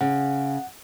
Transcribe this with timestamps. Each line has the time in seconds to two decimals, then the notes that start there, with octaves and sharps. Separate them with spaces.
0.01 C#3 F#5